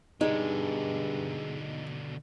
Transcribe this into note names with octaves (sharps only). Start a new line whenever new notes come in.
G2 B2 D3 G#3 D#4